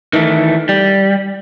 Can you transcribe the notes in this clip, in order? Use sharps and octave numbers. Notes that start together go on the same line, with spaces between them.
D#3 E3 A3
G3